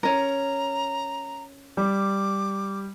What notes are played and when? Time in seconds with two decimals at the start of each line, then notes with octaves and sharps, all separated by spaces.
0.03 C#4 A#4 A#5
1.77 G3 D6